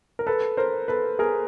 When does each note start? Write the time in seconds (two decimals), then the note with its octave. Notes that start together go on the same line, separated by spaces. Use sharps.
0.19 A#4
0.27 A4 B4
0.57 A#4 C5
0.88 A4 B4
1.19 G#4 A#4